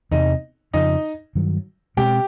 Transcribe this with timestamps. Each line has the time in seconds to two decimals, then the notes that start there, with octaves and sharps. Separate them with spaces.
0.11 E2 C3 E3 D#4 D#5
0.73 F2 C#3 F3 D#4 D#5
1.35 G2 D#3 F#3
1.97 B2 G#3 C4 G4 G5